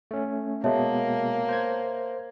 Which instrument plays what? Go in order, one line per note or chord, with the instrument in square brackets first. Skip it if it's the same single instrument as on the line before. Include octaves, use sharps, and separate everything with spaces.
[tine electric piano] A3 C#4
[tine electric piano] B2 G#3 B3 [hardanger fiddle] A#3 [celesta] C#5 E5 A5
[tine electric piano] C5 G#6